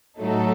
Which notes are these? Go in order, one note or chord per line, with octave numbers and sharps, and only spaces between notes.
A2 F#3 A3 D#4 A4